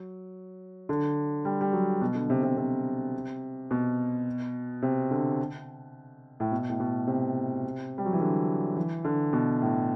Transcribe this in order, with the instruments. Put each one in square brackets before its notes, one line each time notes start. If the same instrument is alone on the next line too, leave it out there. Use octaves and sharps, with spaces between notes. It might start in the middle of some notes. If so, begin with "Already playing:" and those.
Already playing: [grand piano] F#3
D3
G3
G3
F#3
B2
D3
C3
C3
C3
B2
C3
D3
A2
B2
A2
B2
C3
G3
F#3
E3
D3
E3
D3
B2
A2